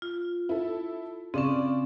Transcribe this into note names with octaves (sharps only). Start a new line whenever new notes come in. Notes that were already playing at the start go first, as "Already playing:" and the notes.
F4
E4 A4
C#3 C4 C#4 D5